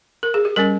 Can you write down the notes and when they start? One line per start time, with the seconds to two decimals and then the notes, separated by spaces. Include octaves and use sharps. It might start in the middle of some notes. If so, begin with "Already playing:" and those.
0.23 A#4
0.34 G#4
0.45 G4
0.56 G3 C#4 A#4